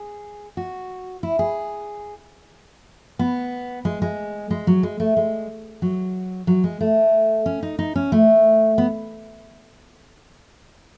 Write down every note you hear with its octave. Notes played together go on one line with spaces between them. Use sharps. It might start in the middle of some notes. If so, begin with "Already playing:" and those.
Already playing: G#4
F#4
E4
G#4
B3
G#3
G#3
G#3
F#3
G#3
A3
G#3
F#3
F#3
G#3
A3
C#4
D#4
D#4
C#4
A3
B3